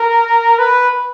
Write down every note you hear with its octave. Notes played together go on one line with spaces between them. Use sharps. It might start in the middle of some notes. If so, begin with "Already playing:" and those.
Already playing: A#4
B4